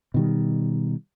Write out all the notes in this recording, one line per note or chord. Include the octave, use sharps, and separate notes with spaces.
B2 D#3 G3